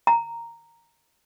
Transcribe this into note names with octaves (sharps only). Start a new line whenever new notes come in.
A#5